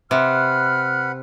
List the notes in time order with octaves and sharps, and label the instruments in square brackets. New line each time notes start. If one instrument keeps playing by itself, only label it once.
[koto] C3 [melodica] B4 F#5 B5 [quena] F6